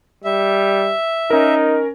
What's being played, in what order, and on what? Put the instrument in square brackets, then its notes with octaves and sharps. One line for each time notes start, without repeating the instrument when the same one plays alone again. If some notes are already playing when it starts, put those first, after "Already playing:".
[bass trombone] G3 [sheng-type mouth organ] E5
[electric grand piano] C#4 A#4 [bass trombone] D#4